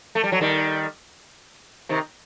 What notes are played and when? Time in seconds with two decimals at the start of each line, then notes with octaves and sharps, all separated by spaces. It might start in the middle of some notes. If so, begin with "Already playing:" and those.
0.15 A3
0.24 G3
0.32 F#3
0.41 D#3 G3
1.89 C3 D#3